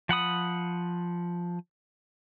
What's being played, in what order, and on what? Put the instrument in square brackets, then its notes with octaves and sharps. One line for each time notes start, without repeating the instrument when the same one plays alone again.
[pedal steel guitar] F3 F#5 B5 D#6